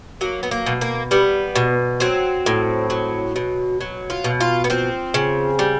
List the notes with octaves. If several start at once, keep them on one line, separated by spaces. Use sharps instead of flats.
F#3 A#3
B3
A#3
B2
A#3
G3 B3
B2
F#3 C4
A2
F#3
B2
F#3
F4
B2
F4
B3
F3 C4
C#3
G3